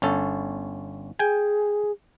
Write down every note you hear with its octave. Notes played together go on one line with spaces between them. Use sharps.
G1 C#4 A4
G#4 G5 G#5